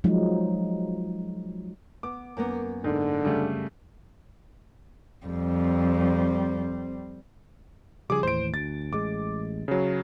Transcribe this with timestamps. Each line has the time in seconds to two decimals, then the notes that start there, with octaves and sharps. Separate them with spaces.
0.04 F3 F#3 G#3 D#4
2.03 B3 D6
2.37 F#2 A#3 B3
2.84 G#2 D3
3.25 C#3 G3 A3
5.26 F2 G3 C4
8.10 C#3 F3 G3 G#4 D6
8.23 D#2 A2 E3 C5 D7
8.54 D2 A6
8.93 A1 G#3 D6
9.68 C#3 F#3